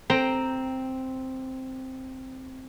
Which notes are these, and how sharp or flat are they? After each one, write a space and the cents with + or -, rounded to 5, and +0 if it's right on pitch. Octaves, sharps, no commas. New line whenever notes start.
C4 +0 G5 +0 A#5 +0